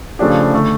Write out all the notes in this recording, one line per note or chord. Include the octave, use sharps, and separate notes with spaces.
C#3 F3 A3 D4 G4
D3 A3